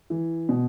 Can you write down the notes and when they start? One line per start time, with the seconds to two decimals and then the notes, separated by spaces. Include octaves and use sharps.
0.10 E3
0.49 B2